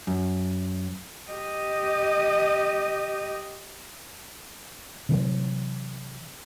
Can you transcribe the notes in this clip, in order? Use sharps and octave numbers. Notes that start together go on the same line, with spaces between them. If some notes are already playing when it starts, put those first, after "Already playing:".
F#2
G4 D#5
C3 E3 F#3